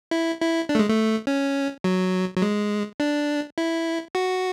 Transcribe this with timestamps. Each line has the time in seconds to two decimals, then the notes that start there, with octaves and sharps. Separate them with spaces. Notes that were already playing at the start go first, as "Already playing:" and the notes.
0.11 E4
0.41 E4
0.69 D4
0.75 A3
0.79 G#3
0.89 A3
1.27 C#4
1.84 F#3
2.37 F#3
2.42 G#3
3.00 D4
3.58 E4
4.15 F#4